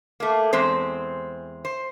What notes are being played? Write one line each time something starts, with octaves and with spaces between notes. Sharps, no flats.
A3 A#3
E2 G#3 C4 C5
C5